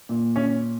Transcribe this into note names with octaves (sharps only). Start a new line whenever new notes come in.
A#2
C#4